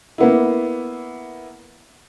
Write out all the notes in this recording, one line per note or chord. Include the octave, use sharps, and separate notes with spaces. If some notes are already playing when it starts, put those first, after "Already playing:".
A#3 B3 E4